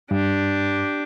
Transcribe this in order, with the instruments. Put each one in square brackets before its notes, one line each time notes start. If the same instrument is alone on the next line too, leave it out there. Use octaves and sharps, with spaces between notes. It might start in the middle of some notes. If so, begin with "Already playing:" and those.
[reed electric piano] G2 [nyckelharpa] D4 G4